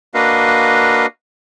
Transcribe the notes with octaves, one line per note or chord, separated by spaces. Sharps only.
A#3 D4 F#4 B4 D#5 F5